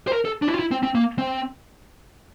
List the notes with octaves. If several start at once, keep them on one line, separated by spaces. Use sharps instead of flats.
C5
A#4
A4
D4
E4
F4
E4
C4
C4
A#3
C4